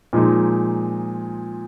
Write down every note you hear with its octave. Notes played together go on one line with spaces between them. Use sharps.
A#2 F3 G#3 D#4